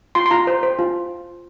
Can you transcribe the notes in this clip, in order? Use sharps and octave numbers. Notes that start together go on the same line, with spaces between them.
F4 C6
C6
F4 A#5
C5
C5
F4